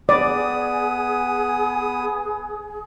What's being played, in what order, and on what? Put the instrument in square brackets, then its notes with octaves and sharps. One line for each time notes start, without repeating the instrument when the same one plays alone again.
[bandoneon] B3 D#6 [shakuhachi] G#4 [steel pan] D5